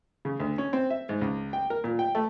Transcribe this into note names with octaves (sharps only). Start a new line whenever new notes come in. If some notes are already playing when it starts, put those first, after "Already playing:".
C#3
D2
C#4
C4
E5
G#2
C#2
G5
A#4
A#2
G5
A3